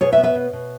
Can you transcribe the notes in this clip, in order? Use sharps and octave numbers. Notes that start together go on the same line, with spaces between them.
B2 G#4 C#5
B4 E5
B3
B4 E5
B2
B2